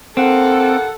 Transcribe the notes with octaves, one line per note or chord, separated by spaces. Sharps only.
D#2 A#3 C4 A4 F#5